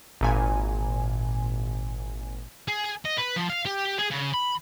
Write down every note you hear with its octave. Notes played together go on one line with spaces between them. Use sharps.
G#1 A#2 G#5
G#4
D#5
B4
F3
F5
G4
G#4
C#3
B5